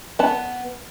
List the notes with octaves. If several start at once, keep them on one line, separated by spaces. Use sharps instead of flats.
B3 A5